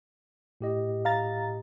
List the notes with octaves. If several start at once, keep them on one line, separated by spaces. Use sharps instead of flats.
A2 G4 D#5
F5 A#5 A6